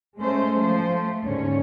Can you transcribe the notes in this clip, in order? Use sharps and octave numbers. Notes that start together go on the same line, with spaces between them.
G#3 A3 C#4 C5
F3 C5
A3
D#2 G#2 D3 C#4 C#5